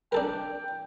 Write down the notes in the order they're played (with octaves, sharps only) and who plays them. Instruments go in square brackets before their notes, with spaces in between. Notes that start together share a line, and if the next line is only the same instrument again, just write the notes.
[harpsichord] D4 A4 A#4 [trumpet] G5